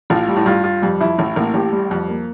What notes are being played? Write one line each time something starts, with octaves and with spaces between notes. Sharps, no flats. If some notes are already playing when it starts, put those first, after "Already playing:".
A1 A2 F4
G3
A2
G2 F4
F4
F2 G3
F2 E4
A1 A2 E4
A1 A2 A#3
A1 A2 G4
G3
F2 G3
A#3